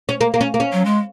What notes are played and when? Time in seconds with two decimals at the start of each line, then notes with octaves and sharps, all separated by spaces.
0.09 C#4
0.21 A#3
0.34 A#3
0.41 C#4
0.54 A#3
0.60 C#4
0.72 F#3
0.85 G#3